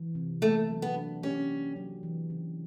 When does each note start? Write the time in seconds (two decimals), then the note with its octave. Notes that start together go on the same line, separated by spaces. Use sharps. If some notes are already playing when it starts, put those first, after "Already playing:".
Already playing: E3
0.15 C3
0.42 A3 A#3
0.69 F#3
0.82 B3
0.97 D4
1.23 C#4 G4
1.49 A#3
1.76 F#3
2.03 E3
2.30 C#3